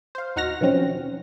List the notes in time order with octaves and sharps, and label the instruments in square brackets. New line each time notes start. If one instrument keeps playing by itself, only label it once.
[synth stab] C5 F5
D#2 D#4 F#4 F#5 F6 A#6
B2 D#3 F3 F#3 C4 C#4